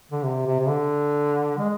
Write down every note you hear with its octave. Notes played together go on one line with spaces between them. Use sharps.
D3
C3
C3
C3
D3
G#3